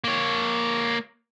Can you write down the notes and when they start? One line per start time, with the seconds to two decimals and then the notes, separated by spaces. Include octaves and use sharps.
0.04 A#3 C#5